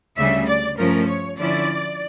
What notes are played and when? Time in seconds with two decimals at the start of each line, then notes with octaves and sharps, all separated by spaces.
0.17 D2 C#3 G3 E5
0.47 D5
0.77 G2 F3 A3 C#4 A#4
1.07 C#5
1.37 D3 F3 C#4 E4 D5